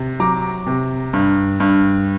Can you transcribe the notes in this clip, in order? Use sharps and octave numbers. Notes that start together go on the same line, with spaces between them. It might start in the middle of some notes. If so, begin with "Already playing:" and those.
Already playing: C3
F#3 A#5 D6
C3
G2
G2